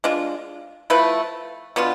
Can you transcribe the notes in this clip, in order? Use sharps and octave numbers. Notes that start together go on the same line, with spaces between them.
G#3 D4 F4
F3 A3 E4 B4
B2 B3 D4 F4